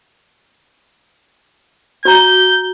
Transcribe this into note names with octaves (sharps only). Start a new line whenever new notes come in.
F#4 A#5 G6